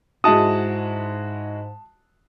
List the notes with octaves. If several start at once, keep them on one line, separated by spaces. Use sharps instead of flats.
G#2 G#3 E4 F#4 A5 D#6